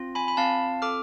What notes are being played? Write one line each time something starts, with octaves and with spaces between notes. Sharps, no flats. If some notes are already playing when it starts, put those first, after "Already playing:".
Already playing: C4 F4
G#5 B5
B5
C4 F5 A5
A4 D6 F6